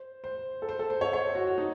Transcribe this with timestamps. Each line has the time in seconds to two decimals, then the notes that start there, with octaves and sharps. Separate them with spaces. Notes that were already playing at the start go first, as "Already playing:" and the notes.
Already playing: C5
0.24 C5
0.62 A4
0.69 C5
0.79 A4
0.90 C5
1.01 C#5
1.13 C#5
1.35 F#4
1.47 F#4
1.58 D#4